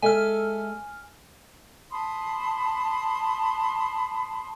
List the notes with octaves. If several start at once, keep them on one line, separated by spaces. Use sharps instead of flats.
G#3 A4 E5 G#5 F6
A5 B5 C6 D#6